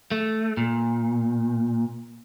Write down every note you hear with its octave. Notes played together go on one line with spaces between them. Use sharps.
A3
A#2